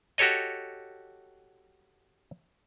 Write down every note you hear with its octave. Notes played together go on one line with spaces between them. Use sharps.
F#4 G4 A4 C#5 D#5